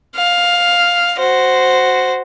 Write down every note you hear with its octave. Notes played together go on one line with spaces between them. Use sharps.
F5
F#4 C5